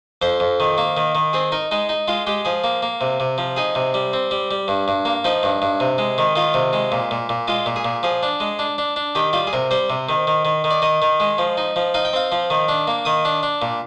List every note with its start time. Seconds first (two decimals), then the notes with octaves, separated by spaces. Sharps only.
0.22 F2 C5
0.40 F2
0.60 D#3
0.78 A#3
0.97 D#3
1.15 D#3
1.33 C4 G#4
1.52 D#4 A#4
1.71 G#3 D#4
1.89 D#4
2.08 G#3 F4
2.27 G#3 G4
2.45 F3 G#4
2.64 A#3
2.83 A#3
3.01 C3
3.20 C3
3.38 F3
3.56 D#4 G#4
3.75 C3
3.94 G3
4.13 C4
4.31 G3
4.51 G3
4.68 G2
4.88 G2
5.05 A#3
5.24 F3 D#4
5.43 G2
5.62 G2
5.80 C3
5.98 G#3
6.18 D#3
6.36 D#3 F4
6.54 C3
6.73 G#3
6.92 A#2
7.11 A#2
7.29 A#2
7.48 G#3 F4
7.66 A#2
7.76 G#4
7.85 A#2
8.03 F3 G#4
8.23 D4
8.40 G#3
8.59 D4
8.78 D4
8.96 D4
9.15 D#3 G4
9.33 G3 F4
9.47 G#4
9.53 C3 A#4
9.71 G3 C5
9.90 C3
10.09 D#3
10.27 D#3
10.45 D#3
10.64 D#3
10.70 D5
10.82 D#3 D#5
11.02 D#3
11.20 G#3
11.38 F3
11.57 D#4
11.76 F3
11.94 D#4 F5
12.05 G5
12.13 C4 F5
12.32 F3
12.50 D#3
12.68 D4
12.87 A#3
13.05 D#3 D#6
13.25 D4
13.43 D4
13.62 A#2